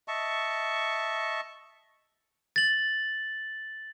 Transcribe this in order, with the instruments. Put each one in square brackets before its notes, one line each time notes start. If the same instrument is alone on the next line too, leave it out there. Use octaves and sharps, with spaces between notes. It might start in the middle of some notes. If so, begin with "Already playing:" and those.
[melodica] D#5 E5 A5 C#6
[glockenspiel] A6 F#7